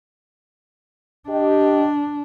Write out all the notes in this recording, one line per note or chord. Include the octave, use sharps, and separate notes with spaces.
D4 G4 D#5